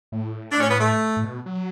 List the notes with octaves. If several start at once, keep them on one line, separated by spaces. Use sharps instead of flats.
A2
D4
C#4
B3
A3
A2
B2
F#3